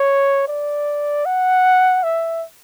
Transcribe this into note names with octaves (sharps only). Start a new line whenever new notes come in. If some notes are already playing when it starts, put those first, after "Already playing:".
Already playing: C#5
D5
F#5
E5